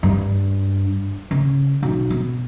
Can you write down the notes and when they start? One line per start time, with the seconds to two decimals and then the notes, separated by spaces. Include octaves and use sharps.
0.03 G2
1.31 C#3
1.83 B1
2.10 B2